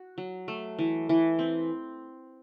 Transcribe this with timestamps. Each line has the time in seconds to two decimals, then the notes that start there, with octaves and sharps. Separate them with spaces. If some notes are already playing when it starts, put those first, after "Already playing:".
Already playing: F#4
0.18 F#3
0.48 A3
0.79 E3
1.09 E3
1.39 C4